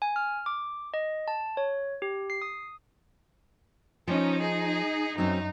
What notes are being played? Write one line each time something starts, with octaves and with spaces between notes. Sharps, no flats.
G#5
F6
D6
D#5
A5
C#5
G4
C7
D#6
F3 C#4 D#4
G#4
F#2 F#3 C4 C#4 D#4